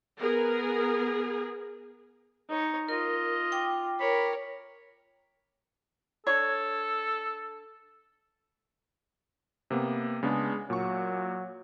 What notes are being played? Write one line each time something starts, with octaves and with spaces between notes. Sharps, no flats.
B3 G#4 A#4
D#4 C#5
F4 A#4 D#5
G5 D6
A#4 C#5 B5
D4 A4 C#5
C3 A#3 B3
C#3 G#3 B3 D4
A#2 F#3 C#6